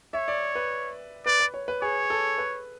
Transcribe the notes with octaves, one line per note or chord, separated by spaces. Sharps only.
C#5 E5
D5
B4
B4 D5
B4
C#5
B4
G#4 C#5
A4
B4